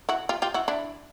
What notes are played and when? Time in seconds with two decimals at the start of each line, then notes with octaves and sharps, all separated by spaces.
0.09 E4 F#4
0.29 F4 G4
0.42 F4 G4
0.54 E4 F#4
0.68 D4 E4